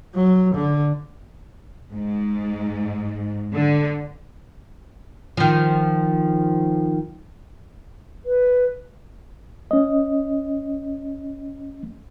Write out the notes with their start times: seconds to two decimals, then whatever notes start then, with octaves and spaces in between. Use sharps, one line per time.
0.14 F#3
0.55 D3
1.91 G#2
3.54 D3
5.37 D#3 F3
8.26 B4
9.71 C#4 D#5